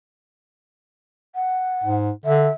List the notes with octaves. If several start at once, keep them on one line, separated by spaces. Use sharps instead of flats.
F#5
G#2
D3 E5